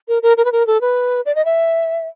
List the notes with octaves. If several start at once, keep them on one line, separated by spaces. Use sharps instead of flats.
A#4
A#4
A#4
B4
A#4
A4
B4
D5
D#5
E5